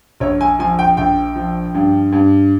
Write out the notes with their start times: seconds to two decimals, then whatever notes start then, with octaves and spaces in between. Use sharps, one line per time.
0.20 A#1 C#5
0.41 G#5
0.59 F3 G#5
0.79 G5
0.97 A#1 G5
1.36 F3
1.74 G2
2.12 G2